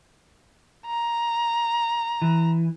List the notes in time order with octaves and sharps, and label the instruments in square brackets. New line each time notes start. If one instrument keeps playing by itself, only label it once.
[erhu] A#5
[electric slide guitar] E3